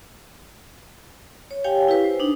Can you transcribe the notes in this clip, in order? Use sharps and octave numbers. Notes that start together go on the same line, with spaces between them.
C#5
G4 C#5 F5 G5 G#5
E4 G4 B4
C5
D4 D#4